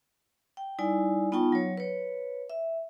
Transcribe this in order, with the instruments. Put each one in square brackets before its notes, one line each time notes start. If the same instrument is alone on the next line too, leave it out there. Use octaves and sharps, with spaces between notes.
[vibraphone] G5
G3 D#4 E4 D5 G#5
B3 D#4 F4 G5 A5 C#6
F#3 C#5
B4 C#5
E5